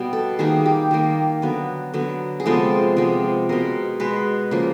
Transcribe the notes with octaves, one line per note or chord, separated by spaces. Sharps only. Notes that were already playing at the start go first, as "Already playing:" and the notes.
Already playing: B2 G3 B3
A4
D#3 G3 A#3 G#4
G4
D#3 G3 A#3
D3 F#3 B3
D3 F#3 B3
G#4
C3 F3 G#3 B3 A4
C3 F3 G#3 B3
B2 G#3 B3 A#4
B2 G#3 B3 B4
C#3 F3 A#3